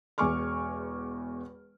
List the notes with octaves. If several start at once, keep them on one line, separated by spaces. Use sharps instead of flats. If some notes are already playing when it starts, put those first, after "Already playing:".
E1 E2 G#5 C#6 D6 F6